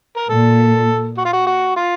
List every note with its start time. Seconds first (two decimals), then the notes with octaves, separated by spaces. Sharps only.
0.16 A#4
0.29 A#2 A4
1.17 F#4
1.25 F4
1.33 F#4
1.47 F#4
1.76 F4